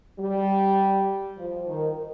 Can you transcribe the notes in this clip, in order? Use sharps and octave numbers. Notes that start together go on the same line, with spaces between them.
G3
F3
D#3